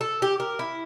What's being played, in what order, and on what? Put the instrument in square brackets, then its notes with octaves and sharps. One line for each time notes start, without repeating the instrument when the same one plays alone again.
[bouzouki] A4
G4
A#4
E4